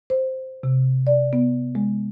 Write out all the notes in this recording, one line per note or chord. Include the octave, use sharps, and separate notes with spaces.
C5
C3
D5
B3
G#3